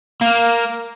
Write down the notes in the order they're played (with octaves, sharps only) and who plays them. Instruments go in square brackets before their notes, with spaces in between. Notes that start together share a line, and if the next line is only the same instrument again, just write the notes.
[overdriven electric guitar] A#3